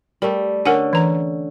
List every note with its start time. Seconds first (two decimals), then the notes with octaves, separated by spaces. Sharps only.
0.22 G3 A3 A#4
0.65 D3 C#4 A#4 F#5 G#5
0.93 E3 A#5